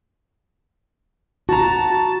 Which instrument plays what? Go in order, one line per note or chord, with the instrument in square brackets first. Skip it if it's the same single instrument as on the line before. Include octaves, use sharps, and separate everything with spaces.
[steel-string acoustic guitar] F#4 A#5 [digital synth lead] A5